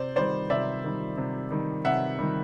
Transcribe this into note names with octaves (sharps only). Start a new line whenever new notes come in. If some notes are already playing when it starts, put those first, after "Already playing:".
Already playing: C3 C5 D5
D#3 G3 C5 D5
C3 D5 E5
D#3 G3
C3
D#3 G3
C3 E5 F#5
D#3 G3